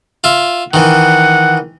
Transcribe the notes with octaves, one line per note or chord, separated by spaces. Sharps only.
F4 E5
D#3 E3 F#5